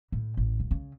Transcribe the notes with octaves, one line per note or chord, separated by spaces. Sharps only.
A2
A1
D1
C#3